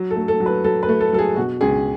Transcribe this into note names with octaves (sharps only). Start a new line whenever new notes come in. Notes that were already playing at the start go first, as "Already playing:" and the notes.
Already playing: F#3
A4
A3
A4
F#3
B4
F#3 A4
B4
A3
A4
F#3 A4
G#4
B2 F#4
C#2 G#4